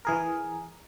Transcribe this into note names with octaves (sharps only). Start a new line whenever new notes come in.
E3 G#4 A#4